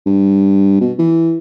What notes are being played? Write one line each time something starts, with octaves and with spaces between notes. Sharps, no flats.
G2
B2
E3